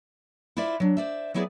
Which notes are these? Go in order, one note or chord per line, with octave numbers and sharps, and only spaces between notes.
E4 F4 C5 D5 E5
F#3 D4
C5 D5 E5
F#3 B3 E4 G#4 C5 D5